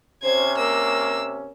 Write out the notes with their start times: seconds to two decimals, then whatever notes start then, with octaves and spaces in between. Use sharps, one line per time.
0.23 C3 C#4 C5 G#6
0.58 A#3 E6